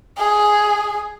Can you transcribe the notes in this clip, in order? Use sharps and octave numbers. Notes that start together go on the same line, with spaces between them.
G#4